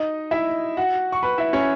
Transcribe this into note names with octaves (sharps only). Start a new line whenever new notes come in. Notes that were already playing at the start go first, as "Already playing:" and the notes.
Already playing: D#4 D#5
E4 E5
F#4 F#5
C#6
B4 B5
E4 E5
C#4 C#5